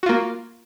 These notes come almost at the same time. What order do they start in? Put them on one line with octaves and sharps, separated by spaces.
F#4 F4 A#3